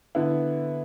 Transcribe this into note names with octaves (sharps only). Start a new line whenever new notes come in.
D3 B3 E4